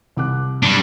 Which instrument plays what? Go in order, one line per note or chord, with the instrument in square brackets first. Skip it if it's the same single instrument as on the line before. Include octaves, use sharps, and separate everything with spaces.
[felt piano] C2 D6 F#6
[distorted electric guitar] G3 D4